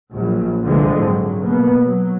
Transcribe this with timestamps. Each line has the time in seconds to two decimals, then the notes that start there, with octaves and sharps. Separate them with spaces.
0.14 A#1 A#2 F#3
0.64 C2 F2 D3 E3 G#3 C4
1.00 G#1 F#3
1.41 B2 A#3 B3
1.86 F#3